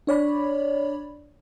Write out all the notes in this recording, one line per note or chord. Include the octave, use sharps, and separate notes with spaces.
D4 C#5 D5 B5